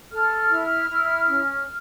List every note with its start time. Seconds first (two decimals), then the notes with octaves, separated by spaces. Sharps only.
0.11 A4 F6
0.50 E4
0.90 E4
1.28 C#4